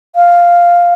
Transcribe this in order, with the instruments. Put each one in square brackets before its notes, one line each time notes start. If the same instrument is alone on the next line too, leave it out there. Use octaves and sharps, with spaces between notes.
[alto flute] F5